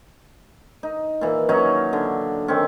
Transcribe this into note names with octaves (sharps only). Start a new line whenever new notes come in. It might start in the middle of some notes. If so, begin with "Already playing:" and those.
D#4
A#2 E3
F#3 C#4 D#4 C#5
D3
D#3 C4 C#4